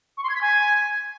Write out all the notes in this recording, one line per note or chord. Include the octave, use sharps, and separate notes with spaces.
C#6
C6
G#6
B6
G#5